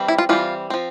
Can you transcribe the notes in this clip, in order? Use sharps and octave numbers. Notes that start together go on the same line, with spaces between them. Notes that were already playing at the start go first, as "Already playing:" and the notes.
Already playing: E3 G3 C4
E4
F4
E3 G3 C4 F4
F3 C4